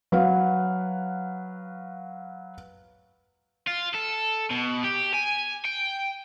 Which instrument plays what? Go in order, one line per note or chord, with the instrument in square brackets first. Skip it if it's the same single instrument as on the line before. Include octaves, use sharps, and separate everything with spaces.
[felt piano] F#3 B4 F5 F#5
[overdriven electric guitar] F4
A4
B2
G4
G#5
G5